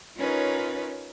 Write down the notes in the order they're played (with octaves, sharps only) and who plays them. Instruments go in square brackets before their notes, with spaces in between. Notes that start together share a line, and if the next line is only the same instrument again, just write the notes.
[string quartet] C#4 D#4 F4 A#4 B4 C#5